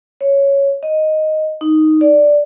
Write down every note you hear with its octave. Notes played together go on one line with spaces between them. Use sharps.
C#5
D#5
D#4
D5